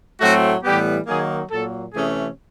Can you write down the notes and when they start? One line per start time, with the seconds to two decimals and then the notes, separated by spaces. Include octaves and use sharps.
0.21 A2 F#3 A3 C4 F#4
0.64 A2 E3 G3 B3 G4
1.07 D#3 F#3 A#3 D#4 G#4
1.50 A#2 F#3 A#3 A4
1.94 C3 E3 A3 C#4 G#4